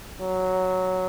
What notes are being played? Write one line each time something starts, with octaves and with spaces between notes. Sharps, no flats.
F#3